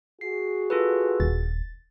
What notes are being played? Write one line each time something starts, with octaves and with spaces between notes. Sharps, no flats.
F#4 G#4 C7
F4 A4 B4
D#1 A6